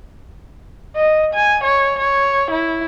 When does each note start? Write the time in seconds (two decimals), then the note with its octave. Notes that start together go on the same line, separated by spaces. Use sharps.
0.96 D#5
1.34 G#5
1.64 C#5
1.99 C#5
2.51 E4